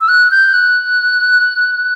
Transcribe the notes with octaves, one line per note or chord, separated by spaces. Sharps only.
E6
F#6
G6
F#6